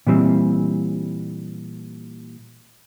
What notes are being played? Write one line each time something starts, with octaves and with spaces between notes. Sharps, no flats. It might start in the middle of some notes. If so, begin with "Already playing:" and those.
A#2 E3 G3 C4